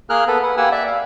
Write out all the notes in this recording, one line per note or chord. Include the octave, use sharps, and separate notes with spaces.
A#3 G#4 A#4 F6 F#6
B3 A4 B4
B4 F#5
A#3 G4 F#5 G#5 E6
D5 E5
F5